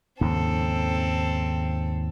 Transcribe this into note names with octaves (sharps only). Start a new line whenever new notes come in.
D#2 G#2 C#3 C4 A4